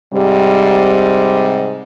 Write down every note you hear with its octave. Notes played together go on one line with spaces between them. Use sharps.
G#2 C3 G3